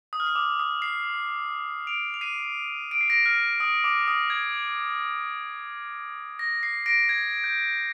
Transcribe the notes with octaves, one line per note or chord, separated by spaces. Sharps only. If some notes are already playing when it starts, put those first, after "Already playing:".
D#6
F6
D#6
D6
D#6
C7
D7 F7
F7
C7 D#7
D7
C7
A#6 D7
F6
D#6
D6
D#6
G#6
A#6
C7
A#6 D7
G#6
G6